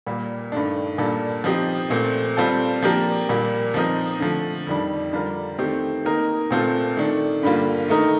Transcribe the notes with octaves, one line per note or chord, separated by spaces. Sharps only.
A#2 G3 A#3
G2 D#3 A3 D4
A#2 G3 A#3 D4 A4
F3 C4 D#4 G4
A#2 A3 C4
G3 C4 F4 A4
F3 A#3 D4 G4 A#4
A#2 G3 A#3
F3 C4 D#4 A#4
D3 F3 A3
F2 D#3 G3 D4
D3 G3 D4 F4 A#4
D#3 A3 C4 G4
D#3 A#3 D#4 A#4
A#2 A3 C4 F4 A4
D#3 A3 D4
G2 D3 G3 A#3 F4
D#3 A3 D#4 A#4